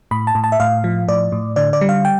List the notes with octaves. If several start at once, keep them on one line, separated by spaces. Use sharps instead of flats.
A2 B5
A5
A2
A5
E5
A2 F5
F3
A2 D5
A2
D3 D5
D5
G3
F5
G5